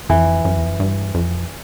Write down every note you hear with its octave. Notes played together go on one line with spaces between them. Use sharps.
F2 E3
F#2
E2
F2
F#2
G2
F2